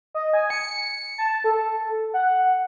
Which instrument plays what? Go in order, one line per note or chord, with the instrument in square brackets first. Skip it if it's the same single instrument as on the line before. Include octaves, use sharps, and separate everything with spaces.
[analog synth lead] D#5
G#5
C#7
A5
A4
F#5